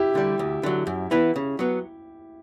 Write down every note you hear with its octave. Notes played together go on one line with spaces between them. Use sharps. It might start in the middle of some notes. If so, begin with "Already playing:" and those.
Already playing: E4 G4
D3 G3
D2
D3 F#3
F#2
E3 B3 E4
C#3
F#3 B3